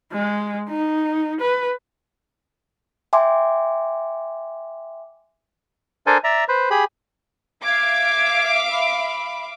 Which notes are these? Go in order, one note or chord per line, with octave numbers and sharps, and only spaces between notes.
G#3
D#4
B4
E5 G5 G#5 C6 D6
D4 A4 A#4 C5 G#5
D5 E5 A#5
B4 C5
G4 G#4 B5
E5 F5 D6 G#6
B5